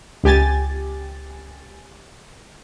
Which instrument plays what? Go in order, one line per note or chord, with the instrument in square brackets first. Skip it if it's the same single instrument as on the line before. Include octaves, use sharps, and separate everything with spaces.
[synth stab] C#2 G4 G#5 A6